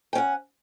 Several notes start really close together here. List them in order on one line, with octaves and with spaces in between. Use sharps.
G5 C#4 F#5